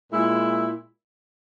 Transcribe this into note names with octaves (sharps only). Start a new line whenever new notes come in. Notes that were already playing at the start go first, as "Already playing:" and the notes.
A#2 G#3 E4